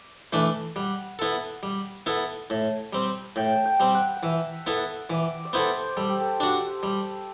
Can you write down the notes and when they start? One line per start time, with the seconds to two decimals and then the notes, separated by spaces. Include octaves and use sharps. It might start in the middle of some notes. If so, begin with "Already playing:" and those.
Already playing: D5
0.33 E3 A3 D4
0.76 G3 F#5
1.19 B3 E4 A4
1.63 G3
2.06 B3 E4 A4
2.50 A2 A5
2.93 G3 C4
3.36 A2 G5
3.56 A5
3.65 G5
3.80 G3 C4
3.94 F#5
4.17 F#5
4.23 E3 E5
4.67 B3 E4 A4
5.10 E3 D5
5.45 D5
5.53 B3 E4 A4 C5
5.97 G3 A4
6.09 G4
6.21 A4
6.40 D4 F#4
6.83 G3